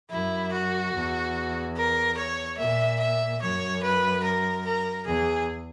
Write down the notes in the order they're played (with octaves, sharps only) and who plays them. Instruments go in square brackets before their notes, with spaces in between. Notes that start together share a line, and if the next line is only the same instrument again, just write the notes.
[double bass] F#2 [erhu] E4
[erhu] F#4
[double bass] E2
[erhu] A#4
C#5
[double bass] A#2 [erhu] E5
[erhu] E5
[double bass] F#2 [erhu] C#5
[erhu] B4
A#4
A#4
[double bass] E2 [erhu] G#4